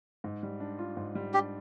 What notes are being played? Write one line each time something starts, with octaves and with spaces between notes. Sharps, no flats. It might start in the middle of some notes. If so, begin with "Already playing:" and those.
G#2
G3
D4
F4
G#2
G3
D4 G4